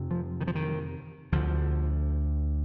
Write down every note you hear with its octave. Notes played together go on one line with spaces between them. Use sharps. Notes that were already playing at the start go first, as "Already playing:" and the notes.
Already playing: F2 C3
F3
D#3
F3
D#3
D2 D3 F3